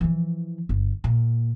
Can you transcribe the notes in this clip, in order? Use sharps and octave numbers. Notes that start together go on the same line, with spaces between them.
E3 F3
G1
A#2